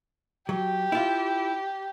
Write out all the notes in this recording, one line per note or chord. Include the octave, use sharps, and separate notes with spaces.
F#3 G4
E4 F4